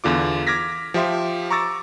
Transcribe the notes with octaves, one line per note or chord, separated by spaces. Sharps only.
E2 D3 F4 D6
D6 F6 G#6 A#6 B6
F3 G4 E5 C6
A#5 C#6 D6 E6 A6 A#6